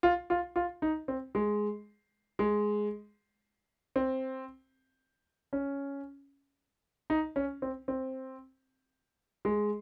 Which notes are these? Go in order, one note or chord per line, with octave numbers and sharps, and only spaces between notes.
F4
F4
F4
D#4
C4
G#3
G#3
C4
C#4
D#4
C#4
C4
C4
G#3